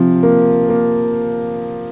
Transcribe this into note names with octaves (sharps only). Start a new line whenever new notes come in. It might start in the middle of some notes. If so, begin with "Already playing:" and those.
Already playing: C3 F3
A#3
A#3